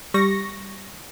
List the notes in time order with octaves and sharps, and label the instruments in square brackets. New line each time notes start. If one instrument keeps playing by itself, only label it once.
[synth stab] G3 C#6 A#6